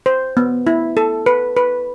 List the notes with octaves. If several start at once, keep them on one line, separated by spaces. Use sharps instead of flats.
C5
B3
E4
A4
B4
B4